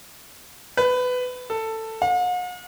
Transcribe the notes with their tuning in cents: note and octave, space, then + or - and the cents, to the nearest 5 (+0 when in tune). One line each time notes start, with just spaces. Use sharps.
B4 +20
A4 +15
F#5 -45